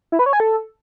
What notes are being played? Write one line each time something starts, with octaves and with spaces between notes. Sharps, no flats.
E4
B4
C#5
G#5
A4